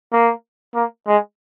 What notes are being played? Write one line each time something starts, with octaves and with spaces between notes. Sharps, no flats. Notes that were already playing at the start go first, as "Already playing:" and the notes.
A#3
A#3
G#3